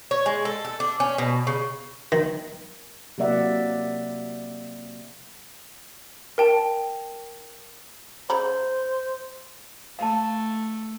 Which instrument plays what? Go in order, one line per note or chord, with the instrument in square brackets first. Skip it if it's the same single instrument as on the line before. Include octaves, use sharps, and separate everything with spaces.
[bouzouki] C#5
G#3
A4
A4
D4
C#4
B2
C#3
[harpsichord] D#3
[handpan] C3 F#3 A#3 D5 E5 F#5
[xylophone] A#4 G5 A5
[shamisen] C#3 A#5 B5 [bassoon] C5
[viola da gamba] A3 [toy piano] F5 A5